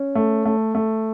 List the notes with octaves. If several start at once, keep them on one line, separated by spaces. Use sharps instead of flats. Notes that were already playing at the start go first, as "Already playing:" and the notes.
Already playing: C#4
A3
A3
A3